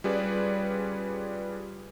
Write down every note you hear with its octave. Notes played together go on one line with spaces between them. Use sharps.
G3 C#4 F4 G#4 B4 D5